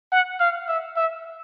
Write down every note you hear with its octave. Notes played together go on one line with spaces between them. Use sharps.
F#5
F5
E5
E5